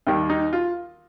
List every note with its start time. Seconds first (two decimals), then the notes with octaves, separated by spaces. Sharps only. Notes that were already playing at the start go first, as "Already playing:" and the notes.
0.07 D#2 D#3 G3 G4
0.30 D#4
0.53 F4